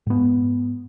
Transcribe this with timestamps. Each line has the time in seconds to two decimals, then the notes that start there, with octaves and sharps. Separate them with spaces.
0.07 G#2 B3